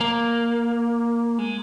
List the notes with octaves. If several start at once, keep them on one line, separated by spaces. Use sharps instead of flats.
A#3
G#3